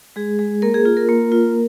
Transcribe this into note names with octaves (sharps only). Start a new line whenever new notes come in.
G#3 G#4
G#3
A#3 A#4
G#4
F4 G#4
A#4
A#3
F4